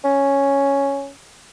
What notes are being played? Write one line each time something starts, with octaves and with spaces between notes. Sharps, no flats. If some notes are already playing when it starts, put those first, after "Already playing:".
C#4